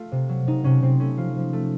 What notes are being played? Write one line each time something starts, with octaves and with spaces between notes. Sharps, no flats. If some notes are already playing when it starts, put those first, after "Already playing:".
Already playing: A3 F4
C3
F#3
C3 D#4
C3 C#4
C3 C4
A3 C#4
F3 F4
F3
A3